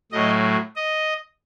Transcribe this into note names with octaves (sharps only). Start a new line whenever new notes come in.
A2 F#3 D#5
D#5